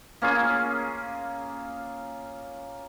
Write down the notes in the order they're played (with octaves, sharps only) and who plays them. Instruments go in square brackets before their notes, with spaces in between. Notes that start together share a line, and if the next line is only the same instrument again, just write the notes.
[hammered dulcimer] A#3 C#4 F4 G#4